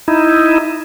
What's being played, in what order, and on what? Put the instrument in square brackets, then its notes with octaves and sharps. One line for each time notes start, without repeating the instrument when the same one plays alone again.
[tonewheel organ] D#4 E4